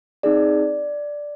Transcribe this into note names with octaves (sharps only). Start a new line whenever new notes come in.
C4 D#4 G#4 D5